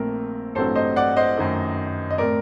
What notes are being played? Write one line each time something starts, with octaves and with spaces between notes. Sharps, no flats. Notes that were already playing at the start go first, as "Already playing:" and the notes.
Already playing: A#1 A#2 A3 C4 A#4
A1 G2 F#3 A3 C4 A4 C5
C5 D#5
D5 F#5
C5 D#5
F#2 D#3 A3
D#5
A2 A3 C4 A#4 D5